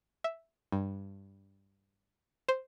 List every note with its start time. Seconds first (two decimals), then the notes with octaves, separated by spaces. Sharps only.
0.24 E5
0.72 G2
2.48 C5